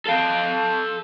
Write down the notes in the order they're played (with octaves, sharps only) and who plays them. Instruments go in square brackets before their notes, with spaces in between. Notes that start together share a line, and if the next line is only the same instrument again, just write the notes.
[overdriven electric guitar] A4 F5